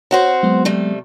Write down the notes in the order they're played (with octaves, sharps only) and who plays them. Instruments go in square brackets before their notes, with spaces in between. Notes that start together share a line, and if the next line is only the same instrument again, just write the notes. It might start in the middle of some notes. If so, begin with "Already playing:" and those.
[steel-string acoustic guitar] C4 F#4 C5 [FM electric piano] C#5
[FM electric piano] F#3 G#3 B3
[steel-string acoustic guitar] C3 G3 A3